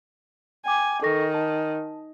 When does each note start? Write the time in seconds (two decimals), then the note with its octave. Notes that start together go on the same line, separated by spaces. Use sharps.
0.66 G5 G#5 D6
1.02 D#3 A4 C#6 A#6
1.34 A5